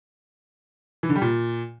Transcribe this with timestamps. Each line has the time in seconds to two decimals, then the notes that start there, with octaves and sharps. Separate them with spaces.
1.03 E3
1.09 D3
1.15 G3
1.22 A#2